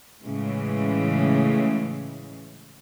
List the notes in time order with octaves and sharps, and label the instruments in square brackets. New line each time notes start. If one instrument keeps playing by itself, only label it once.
[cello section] A2 C#3 E3 G#3